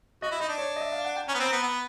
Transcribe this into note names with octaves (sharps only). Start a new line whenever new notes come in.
F#4 D#5
E4
D#4 D#5
D4
C#5
D#5
E5
F5
F#5
G5
C#4 A#5
B3
C4
A#5
B3
B3